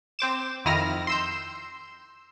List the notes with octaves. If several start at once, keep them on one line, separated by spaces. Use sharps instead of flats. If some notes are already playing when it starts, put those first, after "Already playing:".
C4 C5 D6 E7
F2 D#3 E4 D#6 F6 A#6
C6 E6 G6